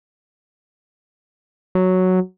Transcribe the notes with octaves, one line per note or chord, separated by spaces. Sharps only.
F#3